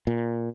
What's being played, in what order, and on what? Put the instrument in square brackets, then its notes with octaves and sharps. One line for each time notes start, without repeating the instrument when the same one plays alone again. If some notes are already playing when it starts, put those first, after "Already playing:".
[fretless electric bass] A#2